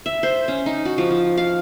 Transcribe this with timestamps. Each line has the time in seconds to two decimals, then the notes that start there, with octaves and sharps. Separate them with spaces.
0.06 E5
0.23 C5
0.48 C#4
0.66 D#4
0.85 F#4
0.98 F3
1.11 F3
1.38 F5